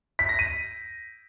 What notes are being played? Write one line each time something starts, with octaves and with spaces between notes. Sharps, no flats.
B6
A#6
D#7